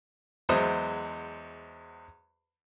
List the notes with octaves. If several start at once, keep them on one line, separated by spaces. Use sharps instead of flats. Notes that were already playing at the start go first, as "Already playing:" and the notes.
E2 F#3 G#3 C5 E5 D#6